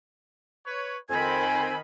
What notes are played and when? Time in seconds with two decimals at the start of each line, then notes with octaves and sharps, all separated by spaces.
0.66 B4 C#5
1.10 F2 D#3 C4 G#5 B5